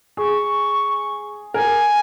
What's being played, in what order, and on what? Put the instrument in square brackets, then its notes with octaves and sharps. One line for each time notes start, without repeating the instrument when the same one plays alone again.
[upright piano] G#4 [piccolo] C#6
[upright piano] A#4 [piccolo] G#5